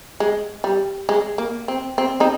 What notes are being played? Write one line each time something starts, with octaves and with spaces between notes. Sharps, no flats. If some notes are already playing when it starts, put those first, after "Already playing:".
G#3
G3
G#3
A#3
C4
C4
C4 D#4